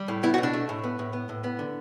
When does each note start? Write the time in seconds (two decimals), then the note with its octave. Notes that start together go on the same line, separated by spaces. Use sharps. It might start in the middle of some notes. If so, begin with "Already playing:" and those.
Already playing: G3
0.08 A2
0.23 B3 E4
0.34 F#4
0.38 B2
0.43 D4
0.53 A3
0.69 A2
0.84 B3
0.99 A2
1.13 B3
1.29 A2
1.44 B3
1.59 D3